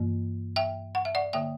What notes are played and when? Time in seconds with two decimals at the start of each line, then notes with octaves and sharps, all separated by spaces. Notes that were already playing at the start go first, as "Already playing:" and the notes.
Already playing: G2 E3 A#3
0.56 E5 G5
0.95 F#5
1.05 E5
1.15 D5 F#5
1.33 D3 A#3 E5 G5